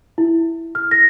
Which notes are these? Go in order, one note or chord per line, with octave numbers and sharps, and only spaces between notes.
E4
F6
A#6